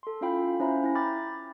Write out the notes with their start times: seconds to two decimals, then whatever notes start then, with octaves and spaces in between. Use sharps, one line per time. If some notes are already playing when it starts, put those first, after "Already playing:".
0.03 A4 C6
0.21 C#4 E4 F4 F5 G5 B5
0.60 C#4 E4 C5 E5 A#5 B5
0.84 E4 A#6
0.95 G5 B5 D6 F6 G6 A6